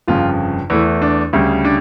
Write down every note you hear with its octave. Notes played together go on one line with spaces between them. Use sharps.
G1 F2 C#3 F4
E2 E3 A3 E4
D4
D2 C#3 G3
D4